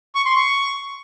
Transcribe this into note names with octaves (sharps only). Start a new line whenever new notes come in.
C#6
C6
C#6